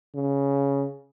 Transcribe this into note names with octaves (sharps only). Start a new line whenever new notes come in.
C#3